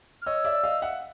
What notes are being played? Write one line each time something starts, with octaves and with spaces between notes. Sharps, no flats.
F6
C#5 D#5 E6
D5 E5
D#5 F5
E5 F#5